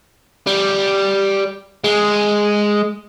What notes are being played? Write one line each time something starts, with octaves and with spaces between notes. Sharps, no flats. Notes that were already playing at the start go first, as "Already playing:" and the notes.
G3
G#3